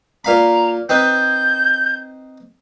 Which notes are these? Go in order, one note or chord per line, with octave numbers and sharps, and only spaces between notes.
A#2 F5 A#5 B5
C4 D#4 B4 G6